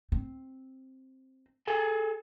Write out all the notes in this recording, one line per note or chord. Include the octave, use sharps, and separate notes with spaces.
C4
G#4 A4 G#5